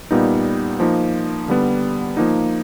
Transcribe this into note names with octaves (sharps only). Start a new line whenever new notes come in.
A#2 G3 B3 D#4
F3 A#3 D#4
D3 G3 B3
F3 A#3 D#4